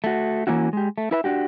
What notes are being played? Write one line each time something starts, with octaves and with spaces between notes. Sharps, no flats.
A3 F#4
E3 A#3 C#4 E4 F#4
G#3 G4
A3
E4 B4 E5
D4 F#4 G4